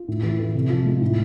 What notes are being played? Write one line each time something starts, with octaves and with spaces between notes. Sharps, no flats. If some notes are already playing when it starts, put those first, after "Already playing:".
Already playing: F4
A2
E3
A3
C3
F3
G#3
A2